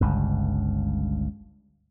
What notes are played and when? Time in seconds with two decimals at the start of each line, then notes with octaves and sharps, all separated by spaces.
0.01 G1 C#2 G2